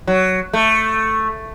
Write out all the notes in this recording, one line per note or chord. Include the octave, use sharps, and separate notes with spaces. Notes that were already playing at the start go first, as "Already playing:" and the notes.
F#3
A3